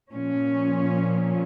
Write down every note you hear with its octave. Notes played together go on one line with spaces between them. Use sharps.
A#2 F3 C#4